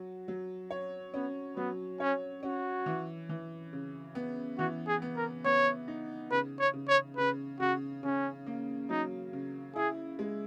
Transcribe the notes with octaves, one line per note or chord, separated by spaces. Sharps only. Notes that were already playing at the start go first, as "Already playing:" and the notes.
Already playing: F#3 F#4
F#3
C#5
B3 C#4
F#3 B3
C#4 C#5
C#4 F#4
E3
E3
C#3
B3
E3 F#4
G#4
B3
A#4
B3 C#5
D#4
C#3 B4
C#5
C#3
C#5
C#3 B4
C#3 F#4
C#3 C#4
A#3
F#3 D#4
C#3
E4 G#4
G#3